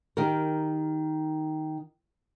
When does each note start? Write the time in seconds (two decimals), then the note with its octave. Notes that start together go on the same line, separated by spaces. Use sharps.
0.17 D#3 G4 A#4